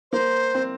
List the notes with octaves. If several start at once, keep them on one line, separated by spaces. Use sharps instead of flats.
A#3 C5
C4